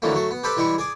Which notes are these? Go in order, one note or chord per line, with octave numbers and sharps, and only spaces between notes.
F2 D3 E3 F#3 A3 A#3
F#3 A3 F#4
B3
G4 A4 B4 C5 D5 B5
E3 G3 G#3 E4 C#6
G#4 D5